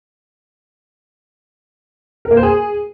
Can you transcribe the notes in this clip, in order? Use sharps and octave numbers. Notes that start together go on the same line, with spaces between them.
A#4
A#3
C5
G#4